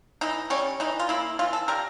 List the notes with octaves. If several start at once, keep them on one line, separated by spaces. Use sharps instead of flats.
E3 D#4
G3 C#4
E3 D#4
F4
A#3 E4
E3 F4
A4
G3 A#4